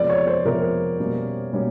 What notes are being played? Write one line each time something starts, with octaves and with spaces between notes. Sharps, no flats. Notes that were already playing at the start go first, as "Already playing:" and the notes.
Already playing: F2 C3 F3 G#3 B3 D5
C#5
C5
F2 C3 F3 G#3 B3 A#4
B2 G3 A#3 C#4
B2 G3 A#3 C#4